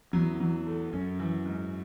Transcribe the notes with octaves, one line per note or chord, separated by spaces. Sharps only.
E2 F#3
F#3
A3
F#2 C#4
E3
G#2